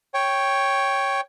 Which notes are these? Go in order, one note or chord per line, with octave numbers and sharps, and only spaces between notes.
C#5 G5